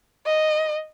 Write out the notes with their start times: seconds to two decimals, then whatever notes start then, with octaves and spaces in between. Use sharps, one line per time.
0.26 D#5